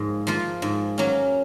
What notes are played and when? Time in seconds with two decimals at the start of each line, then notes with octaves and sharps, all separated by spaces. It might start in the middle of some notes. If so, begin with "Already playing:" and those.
Already playing: G#2 F3 A#3
0.27 F3 A#3 F4
0.62 G#2
0.98 F#3 A#3 C#4